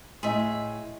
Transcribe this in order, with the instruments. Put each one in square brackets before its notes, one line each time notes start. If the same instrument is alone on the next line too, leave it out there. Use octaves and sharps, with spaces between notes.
[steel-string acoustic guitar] A2 [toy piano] E4 D#5 C6 [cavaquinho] G#4 E5